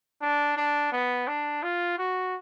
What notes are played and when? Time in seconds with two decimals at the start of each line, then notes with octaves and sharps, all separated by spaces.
0.21 D4
0.57 D4
0.92 B3
1.28 D4
1.63 F4
1.99 F#4